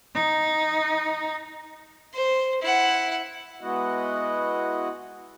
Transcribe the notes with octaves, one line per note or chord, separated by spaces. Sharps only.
D#4
C5
E4 F#5
G#3 B3 E4 F#4 D#5 F#5